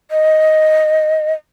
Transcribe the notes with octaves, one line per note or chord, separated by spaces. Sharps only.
D#5